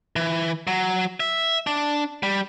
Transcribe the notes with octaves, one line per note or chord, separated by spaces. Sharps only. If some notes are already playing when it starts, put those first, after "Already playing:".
E3
F#3
E5
D4
G3